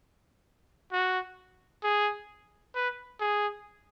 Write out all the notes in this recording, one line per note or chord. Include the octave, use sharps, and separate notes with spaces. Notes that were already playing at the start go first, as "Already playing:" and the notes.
F#4
G#4
B4
G#4